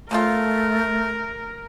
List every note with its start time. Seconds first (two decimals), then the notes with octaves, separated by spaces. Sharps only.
0.11 C#3 F3 A3 F4 A#4